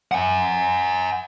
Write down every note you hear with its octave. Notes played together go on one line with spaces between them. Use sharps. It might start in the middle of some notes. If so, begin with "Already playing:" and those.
F#5 G#5